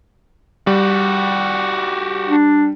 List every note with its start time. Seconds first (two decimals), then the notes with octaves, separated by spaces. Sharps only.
0.67 G3 F#4 G4
2.29 D4